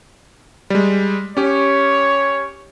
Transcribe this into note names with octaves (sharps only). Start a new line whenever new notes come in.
G3 G#3
C#4 G4 C#5